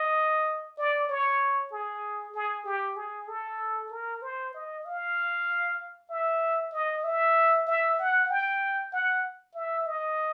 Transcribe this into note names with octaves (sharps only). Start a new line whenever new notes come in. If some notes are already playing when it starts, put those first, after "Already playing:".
Already playing: D#5
D5
C#5
G#4
G#4
G4
G#4
A4
A#4
C5
D#5
F5
E5
D#5
E5
E5
F#5
G5
F#5
E5
D#5